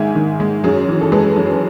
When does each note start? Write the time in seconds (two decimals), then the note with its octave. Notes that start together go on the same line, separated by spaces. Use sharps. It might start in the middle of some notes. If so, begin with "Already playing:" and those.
Already playing: G#2 D#3 G#3 E5 G#5
0.15 D#3
0.40 G#3
0.64 F#2 G#4
0.89 E3
1.01 A4
1.12 G#3 G#4 B4
1.36 F#2